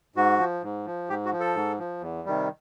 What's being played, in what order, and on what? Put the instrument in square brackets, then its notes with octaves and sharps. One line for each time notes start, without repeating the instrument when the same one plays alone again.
[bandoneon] G#2 F#4
F3
G#2
F3
G#2 G4
F#4
F3
A4
G#2
F3
E2
C3 D#3 G3